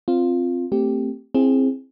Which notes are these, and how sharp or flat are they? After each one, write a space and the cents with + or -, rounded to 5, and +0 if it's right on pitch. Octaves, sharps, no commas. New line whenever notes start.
C4 +0 F4 +0
A3 +30 C4 +0 G4 +0
C4 +20 E4 +0 G#4 +0